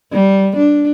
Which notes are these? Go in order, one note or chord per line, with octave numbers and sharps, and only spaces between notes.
G3
D4